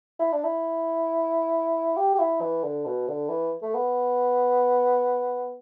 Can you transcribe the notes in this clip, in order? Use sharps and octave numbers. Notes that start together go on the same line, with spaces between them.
E4
D4
E4
G4
G4
E4
E3
D3
B2
D3
E3
A3
B3